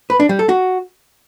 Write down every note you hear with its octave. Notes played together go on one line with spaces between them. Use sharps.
B4
D4
G3
A4
F#4